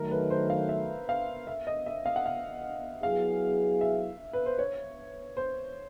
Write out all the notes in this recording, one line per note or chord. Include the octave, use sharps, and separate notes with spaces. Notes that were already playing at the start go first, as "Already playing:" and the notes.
Already playing: D#3 F#3 A3 A#4
B4
C5
F5
E5
F5
E5
D#5
E5
F5
F#5
F5
F#3 B3 E4 G#4 F5
E5
B4
C5
C#5
C5